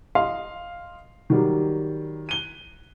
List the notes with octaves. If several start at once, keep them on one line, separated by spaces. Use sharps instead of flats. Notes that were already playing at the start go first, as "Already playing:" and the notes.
D#5 F5 C6
D#3 F#3 G3
D#7 G7